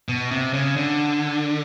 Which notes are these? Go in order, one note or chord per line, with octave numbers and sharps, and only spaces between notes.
B2
C3
C#3
D3